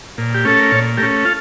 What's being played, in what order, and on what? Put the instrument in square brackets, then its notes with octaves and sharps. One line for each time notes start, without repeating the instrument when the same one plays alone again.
[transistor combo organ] A#2
G4
A3 C#4 A4
A#4
A#2 A4 C#5
A3 G4 A#4
C#4
F4 A4